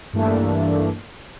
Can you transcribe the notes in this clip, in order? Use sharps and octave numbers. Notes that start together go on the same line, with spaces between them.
G2 E3 A3 A#3 D4